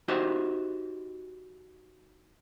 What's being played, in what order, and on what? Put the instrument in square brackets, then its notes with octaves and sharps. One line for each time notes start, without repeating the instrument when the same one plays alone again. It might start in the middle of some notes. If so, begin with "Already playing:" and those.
[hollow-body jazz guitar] D#4 F#4 G4 C5 E5